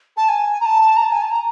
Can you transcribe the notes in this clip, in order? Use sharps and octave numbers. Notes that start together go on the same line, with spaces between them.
A5
G#5
A#5
A5
A#5
A5
G#5
A5
A#5